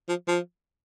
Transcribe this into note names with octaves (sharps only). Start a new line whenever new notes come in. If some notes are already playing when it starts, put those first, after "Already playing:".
F3
F3